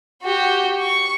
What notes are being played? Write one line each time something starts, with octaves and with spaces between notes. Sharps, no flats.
F#4 G4
C#6